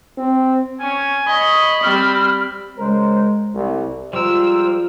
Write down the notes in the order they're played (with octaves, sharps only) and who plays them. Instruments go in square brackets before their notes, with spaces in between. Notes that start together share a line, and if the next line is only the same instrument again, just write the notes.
[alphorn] C4
[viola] C#4 [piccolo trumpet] G#5
[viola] C#5 D#5 [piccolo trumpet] B5
[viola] G3 C4 [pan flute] F6
[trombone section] C#3 A#4 C5 [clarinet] G#3
[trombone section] C2
[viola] F3 G#3 [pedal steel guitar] G3 A#4 [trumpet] C5 [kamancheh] E6